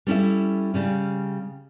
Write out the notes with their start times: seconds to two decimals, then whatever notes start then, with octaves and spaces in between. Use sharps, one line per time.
0.07 G3 C#4 E4 A4 E5
0.74 C#3 G3 C#4